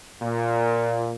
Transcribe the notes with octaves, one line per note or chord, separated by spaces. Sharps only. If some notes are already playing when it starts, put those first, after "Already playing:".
A#2